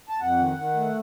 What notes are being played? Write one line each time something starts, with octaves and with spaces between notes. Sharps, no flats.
A5
F2 F#5
D#3
D#3
A3